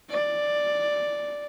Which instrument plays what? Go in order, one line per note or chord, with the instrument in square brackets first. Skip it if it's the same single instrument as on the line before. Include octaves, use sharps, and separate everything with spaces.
[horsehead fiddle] D5